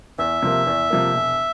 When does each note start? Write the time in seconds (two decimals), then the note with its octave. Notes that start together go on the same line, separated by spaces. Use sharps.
0.19 E2 E5
0.42 C3 F3 A#3
0.67 E2
0.90 C3 F3 A#3
1.14 E1